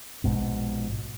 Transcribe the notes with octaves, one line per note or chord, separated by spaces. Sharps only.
A#1 G#2 B2